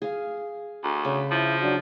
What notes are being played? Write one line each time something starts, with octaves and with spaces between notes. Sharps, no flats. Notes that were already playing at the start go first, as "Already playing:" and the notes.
G#4 F5
D2
C#3 B5 D6
F3 E4
F#3 D4 F#4